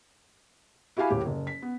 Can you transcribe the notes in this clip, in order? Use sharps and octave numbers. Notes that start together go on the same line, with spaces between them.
E4 F#4 G4 F5 G#5 B5
D#1 A2 G4
F#1
B6
B3